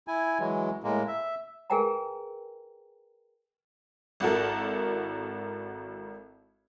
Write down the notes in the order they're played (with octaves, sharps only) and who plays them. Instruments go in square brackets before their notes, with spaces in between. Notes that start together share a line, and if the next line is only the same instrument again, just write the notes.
[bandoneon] E4 G#5
E3 F#3 G#3
A2 G#3 A#3
E5
[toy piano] G#4 A#4 B4 G5 G#5 A#5
[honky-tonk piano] G#1 E4 F#4 A4 A#4